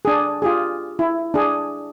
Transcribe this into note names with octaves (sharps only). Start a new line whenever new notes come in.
D4 G#4
F4 G4 G#4
E4
D4 G#4